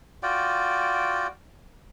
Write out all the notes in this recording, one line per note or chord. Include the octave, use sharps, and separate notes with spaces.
F4 F#4 D5 G5